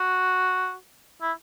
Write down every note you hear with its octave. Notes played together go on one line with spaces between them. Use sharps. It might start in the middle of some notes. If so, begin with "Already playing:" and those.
Already playing: F#4
E4